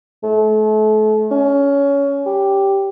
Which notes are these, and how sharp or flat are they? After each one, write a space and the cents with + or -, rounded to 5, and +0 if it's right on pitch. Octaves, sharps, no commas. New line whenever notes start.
A3 -35
C#4 +20
G4 +0